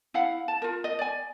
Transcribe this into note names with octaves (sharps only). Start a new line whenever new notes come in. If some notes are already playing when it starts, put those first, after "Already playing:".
E4 F5 F#5
A5
F4 A#4
D#5
D5 G#5